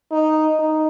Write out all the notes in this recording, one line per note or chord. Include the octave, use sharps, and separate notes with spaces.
D#4
D#4